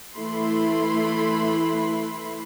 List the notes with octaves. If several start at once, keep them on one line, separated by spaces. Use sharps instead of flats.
E3 A3 E4 B5 C6